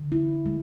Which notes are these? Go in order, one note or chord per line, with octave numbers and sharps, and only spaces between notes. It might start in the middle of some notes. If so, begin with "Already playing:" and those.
Already playing: D3
E4
G#3